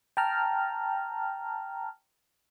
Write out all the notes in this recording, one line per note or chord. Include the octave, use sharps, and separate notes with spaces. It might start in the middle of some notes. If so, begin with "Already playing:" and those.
G5 A5 A#5 F6